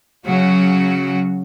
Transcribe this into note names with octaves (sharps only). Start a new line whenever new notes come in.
C#3 F#3 F#4